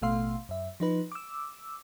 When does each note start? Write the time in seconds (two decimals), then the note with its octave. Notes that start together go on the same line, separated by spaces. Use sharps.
0.02 A1 B2 A3 F5 C6
0.49 F#2 E5
0.80 F3 D#4 B4
1.12 D6 E6